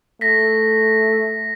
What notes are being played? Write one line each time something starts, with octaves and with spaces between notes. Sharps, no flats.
A3 A#6 B6